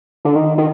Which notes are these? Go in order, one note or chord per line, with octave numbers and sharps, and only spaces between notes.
D3
D#3
D#3